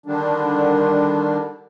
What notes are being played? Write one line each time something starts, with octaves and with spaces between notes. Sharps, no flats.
D3 D#3 G3 D4